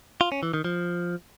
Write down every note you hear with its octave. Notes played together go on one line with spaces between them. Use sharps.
F4
C#4
E3
D#3
F3